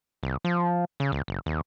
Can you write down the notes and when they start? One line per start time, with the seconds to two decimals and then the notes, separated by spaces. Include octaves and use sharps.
0.23 C2
0.45 F3
1.00 C#3
1.12 C#2
1.28 F#1
1.46 D#2